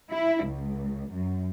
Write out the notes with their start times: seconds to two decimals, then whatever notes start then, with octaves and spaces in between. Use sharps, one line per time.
0.11 E4
0.45 C#2
1.11 F#2